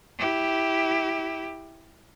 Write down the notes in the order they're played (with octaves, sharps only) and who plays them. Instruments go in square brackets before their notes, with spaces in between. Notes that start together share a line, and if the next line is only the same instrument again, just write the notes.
[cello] E4 G4